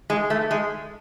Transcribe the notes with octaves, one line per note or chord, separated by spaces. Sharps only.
G#3
A3
G#3